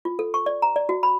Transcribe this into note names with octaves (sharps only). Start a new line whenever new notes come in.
F4
A4
C#6
D5
A#5
D5
F#4
B5